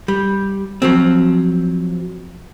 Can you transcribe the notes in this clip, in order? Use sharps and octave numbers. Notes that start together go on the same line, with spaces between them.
G3
F3 F#3 C4